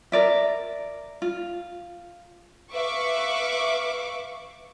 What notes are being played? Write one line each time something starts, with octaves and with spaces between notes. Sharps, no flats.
A#4 D5 E5
F4
B4 E5 F5 C#6 D6